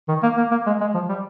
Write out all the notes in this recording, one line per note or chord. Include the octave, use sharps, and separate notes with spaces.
D#3
A#3
A#3
A#3
G#3
G#3
F3
G3